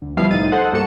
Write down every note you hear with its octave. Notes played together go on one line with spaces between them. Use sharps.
D2
F3 G3 B3 E4 F5 C7
C2 A2 C3 D#4 A6 D#7
A4 C5 D#5 F#5
G2 A#3 F#4 A4 C#7 E7